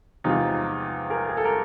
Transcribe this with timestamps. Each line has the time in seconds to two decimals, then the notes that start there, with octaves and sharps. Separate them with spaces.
0.24 E2 C3 F3 G#3 D#4 F4
1.10 G#4 A#4
1.28 G#4
1.37 A4
1.45 A#4